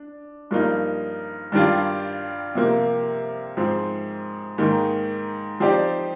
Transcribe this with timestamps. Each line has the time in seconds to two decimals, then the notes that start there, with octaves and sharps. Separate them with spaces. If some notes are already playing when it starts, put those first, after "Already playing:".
Already playing: D4
0.51 G2 F3 A#3 D#4
1.52 G2 D#3 G3 D4 F4
2.55 C3 F3 A#3
3.57 G#2 F3 C4
4.58 G#2 D#3 A#3 D#4
5.60 F3 C4 D#4 G4 D5